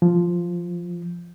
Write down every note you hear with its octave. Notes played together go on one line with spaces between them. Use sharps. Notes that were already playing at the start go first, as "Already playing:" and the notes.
F3